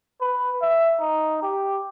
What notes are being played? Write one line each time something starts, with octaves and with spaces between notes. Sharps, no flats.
B4
E5
D#4
G4